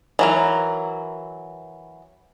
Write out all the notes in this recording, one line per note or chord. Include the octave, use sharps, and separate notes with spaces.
E3 F#3 A#4